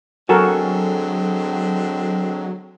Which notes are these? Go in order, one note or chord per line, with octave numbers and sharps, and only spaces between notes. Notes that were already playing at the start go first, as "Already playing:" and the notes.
D3 F#3 G#3 C4 F#4 A4 A#4 G#5